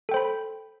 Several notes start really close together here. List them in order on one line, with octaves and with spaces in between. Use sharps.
A4 G5 C5 B5